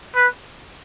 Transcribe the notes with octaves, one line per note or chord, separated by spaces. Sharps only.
B4